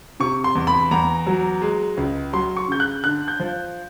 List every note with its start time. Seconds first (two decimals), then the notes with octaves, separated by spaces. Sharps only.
0.20 C3 C#6
0.44 C6
0.55 E2
0.67 B5
0.91 E2 A#5
1.27 F#3
1.62 G#3
1.97 C#2
2.33 F#3 C6
2.57 C#6
2.68 C#3 G6
2.80 F#6
3.04 D3 F#6
3.28 G6
3.40 F3